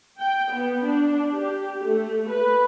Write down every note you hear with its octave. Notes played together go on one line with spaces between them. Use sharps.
G5
B3
D4
G4
A3
B4